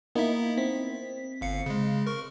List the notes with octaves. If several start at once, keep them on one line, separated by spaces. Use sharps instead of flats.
A#3 B3 D#4 E4 E5
C4 B6
G1 F5 C#7
C#3 G#3
A#4 C#6